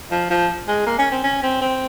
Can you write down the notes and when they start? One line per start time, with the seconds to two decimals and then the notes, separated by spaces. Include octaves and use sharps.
0.11 F3
0.30 F3
0.67 G#3
0.86 A#3
0.98 C#4
1.11 C4
1.24 C#4
1.43 C4
1.61 C4